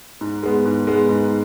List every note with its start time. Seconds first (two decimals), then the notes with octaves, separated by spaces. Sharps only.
0.21 G#2
0.43 G#3 B3
0.65 G#2
0.87 G#3 B3
1.09 G#2